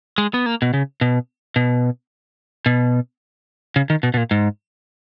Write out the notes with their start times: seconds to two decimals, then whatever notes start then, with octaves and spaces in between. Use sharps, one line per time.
0.18 G#3
0.34 B3
0.46 A#3
0.62 B2
0.74 C#3
1.01 B2
1.56 B2
2.66 B2
3.76 C#3
3.90 D#3
4.03 B2
4.14 B2
4.17 A#2
4.31 G#2